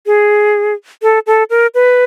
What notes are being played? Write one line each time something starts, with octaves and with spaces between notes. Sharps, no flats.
G#4
A4
A4
A#4
B4